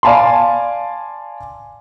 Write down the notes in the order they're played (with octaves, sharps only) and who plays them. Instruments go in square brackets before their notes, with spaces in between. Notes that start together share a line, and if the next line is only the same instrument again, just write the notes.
[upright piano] D5 F5 G#5 A5 B5 C6